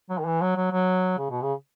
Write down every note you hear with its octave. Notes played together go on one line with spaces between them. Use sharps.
F#3
D#3
E3
F#3
F#3
F#3
C#3
B2
C#3